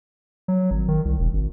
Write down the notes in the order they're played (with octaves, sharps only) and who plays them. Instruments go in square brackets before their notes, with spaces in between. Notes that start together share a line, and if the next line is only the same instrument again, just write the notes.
[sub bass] F#3
G#1
D#3
C2
E1
G#1